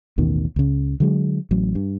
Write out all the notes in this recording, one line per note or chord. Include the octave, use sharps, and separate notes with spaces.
A1 D#2 B2 D#3
C#2 C#3
D3 F#3 G#3
A1 F#3
G2